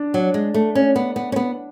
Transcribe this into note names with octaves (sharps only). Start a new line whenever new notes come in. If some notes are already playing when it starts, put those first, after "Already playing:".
Already playing: D4
F#3
G#3
A3
C#4
B3
B3
C#4
B3